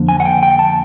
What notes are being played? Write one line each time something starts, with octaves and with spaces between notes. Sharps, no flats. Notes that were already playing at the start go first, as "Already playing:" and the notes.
Already playing: F2 D3 F3 A#3
G#5
F#5
G5
G5
A5